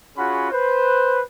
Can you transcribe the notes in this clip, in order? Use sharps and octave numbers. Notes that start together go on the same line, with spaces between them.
C#4 F4 F#4 G#4 F#5 B5
B4 C5